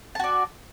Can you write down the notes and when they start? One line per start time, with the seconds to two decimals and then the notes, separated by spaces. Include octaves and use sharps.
0.15 A5
0.19 F#4
0.24 D5